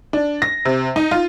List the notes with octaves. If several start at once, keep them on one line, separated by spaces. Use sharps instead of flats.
D4
A#6
C3
D#4
F4